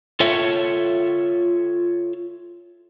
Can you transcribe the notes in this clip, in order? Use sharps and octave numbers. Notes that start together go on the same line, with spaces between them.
F4 A4 C#5 E5